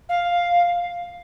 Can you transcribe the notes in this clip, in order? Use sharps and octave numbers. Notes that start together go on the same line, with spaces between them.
F5